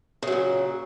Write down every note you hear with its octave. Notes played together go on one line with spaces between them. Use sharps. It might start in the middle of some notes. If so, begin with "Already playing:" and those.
A#2 C#3 F#3